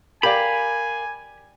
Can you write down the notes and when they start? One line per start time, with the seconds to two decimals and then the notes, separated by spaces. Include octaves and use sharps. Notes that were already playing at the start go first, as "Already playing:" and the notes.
0.23 G4 A#4 D5 F5 G#5 B5